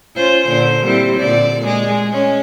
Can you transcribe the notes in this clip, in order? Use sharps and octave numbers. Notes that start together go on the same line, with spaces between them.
C#4 F4 C5
A#2 D3 C5
G3 C4 E4
A#2 D3 D5
G#3 G#4
G#3 C#4